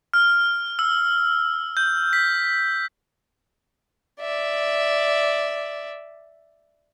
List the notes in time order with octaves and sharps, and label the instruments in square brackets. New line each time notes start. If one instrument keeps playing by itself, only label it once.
[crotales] F6
E6
G6
B6
[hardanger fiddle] D5 E5